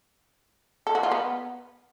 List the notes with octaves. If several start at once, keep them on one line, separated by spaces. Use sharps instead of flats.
A4
F#4
F4
B3